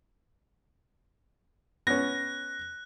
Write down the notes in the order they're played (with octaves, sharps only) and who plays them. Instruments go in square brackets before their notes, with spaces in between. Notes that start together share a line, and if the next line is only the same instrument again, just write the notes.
[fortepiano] B3 C#4 [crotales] F#6 [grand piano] A#6